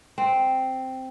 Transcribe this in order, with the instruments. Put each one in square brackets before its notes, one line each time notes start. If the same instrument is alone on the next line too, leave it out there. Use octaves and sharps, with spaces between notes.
[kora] C4